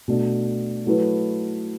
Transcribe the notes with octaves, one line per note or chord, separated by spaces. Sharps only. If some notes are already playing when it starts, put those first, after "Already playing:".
B2 A3 D4
F#3 A3 E4 B4